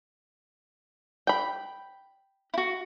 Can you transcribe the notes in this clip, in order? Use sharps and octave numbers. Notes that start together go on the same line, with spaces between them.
G5 B5
E4 F#4